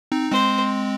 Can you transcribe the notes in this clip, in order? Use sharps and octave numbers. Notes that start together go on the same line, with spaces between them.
C4 D#4
G#3 C4 C5